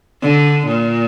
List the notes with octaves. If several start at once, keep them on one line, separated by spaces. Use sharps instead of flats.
D3
A#2